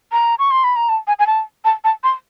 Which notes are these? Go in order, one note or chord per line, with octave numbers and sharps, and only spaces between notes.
A#5
C#6
C6
B5
A#5
A5
G#5
G#5
A5
A5
A5
C6